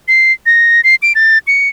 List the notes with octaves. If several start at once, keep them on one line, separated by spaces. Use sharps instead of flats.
C7
A#6
C7
D7
A6
C#7